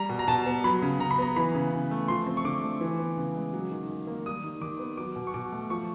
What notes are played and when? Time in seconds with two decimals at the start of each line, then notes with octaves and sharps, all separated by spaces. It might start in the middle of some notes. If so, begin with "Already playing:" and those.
Already playing: G3 A#5
0.09 B2
0.19 A#5
0.28 B2 A5
0.46 B3
0.64 F#3 B5
0.82 C#3
1.00 C#3 A#5
1.11 B5
1.18 B3 A#5
1.36 E3 B5
1.55 C#3
1.72 C#3
1.91 A3
2.08 F3 C6
2.27 C4
2.37 C#6
2.44 D3 D6
2.63 A3
2.81 E3
2.99 B3
3.17 C#3
3.35 G#3
3.53 F#3
3.71 D#3
3.89 D#3
4.07 A#3
4.26 G3 D#6
4.44 D#3
4.61 D#3 D6
4.79 B3
4.97 F#3 D6
5.16 B2
5.27 C#6
5.34 B2 D6
5.52 A3
5.70 F3 C#6